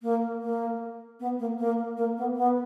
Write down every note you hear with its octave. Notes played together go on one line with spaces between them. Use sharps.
A#3
A#3
B3
A#3
A#3
A#3
B3
B3